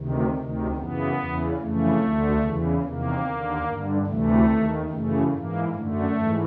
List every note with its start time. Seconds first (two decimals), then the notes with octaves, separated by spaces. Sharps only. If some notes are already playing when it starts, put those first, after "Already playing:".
Already playing: D2 C3 D#3
0.35 D2 C3 D#3
0.76 F#2 C#3 E3 B3
1.17 E2 C#3 E3
1.58 F2 C#3 E3 A3
2.00 D2 D3
2.42 E2 C#3 E3
2.82 E2 C3 D#3 A#3
3.24 D#2 D3
3.65 G2 D3
4.06 D2 C3 E3 A3
4.48 D#2 D#3
4.90 F#2 C#3 E3 A3
5.31 G#2 E3 A#3
5.72 F#2 D3 A3
6.15 G#2 E3